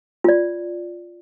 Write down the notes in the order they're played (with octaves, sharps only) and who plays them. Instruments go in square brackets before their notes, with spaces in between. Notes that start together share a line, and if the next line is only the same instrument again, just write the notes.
[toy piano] F4 D5